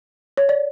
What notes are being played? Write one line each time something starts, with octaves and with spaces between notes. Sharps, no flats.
C#5
D5